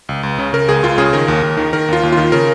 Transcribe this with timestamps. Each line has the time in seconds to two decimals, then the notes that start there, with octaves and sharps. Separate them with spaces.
0.09 C#2
0.23 C#2
0.38 C#3
0.53 C#3 A#4
0.69 C#2 G#4
0.83 C#2 F4
0.98 C#3 G#4
1.13 D#3 A#4
1.28 D#2
1.43 D#2
1.57 D#3
1.73 D#3 A#4
1.88 D#2 F4
2.03 D#2
2.12 D#3 F4
2.32 C#3 A#4